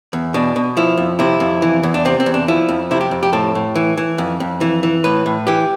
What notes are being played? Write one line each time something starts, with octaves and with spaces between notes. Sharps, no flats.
E2
B2 D4
B2
F3 E4
F2
C3 E4
F2
E3
E2
D4
C3 C4
C4
E2
D4
F3 E4
F2
C3 E4
G4
F2
G4
A2 A4
A2
E3
E3
F2
F2
E3
E3
A2 B4
A2
E3 G4